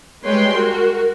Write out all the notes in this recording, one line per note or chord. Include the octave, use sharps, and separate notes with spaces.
G3 G#3 B4 C#5 G5 C6
F#4 A#4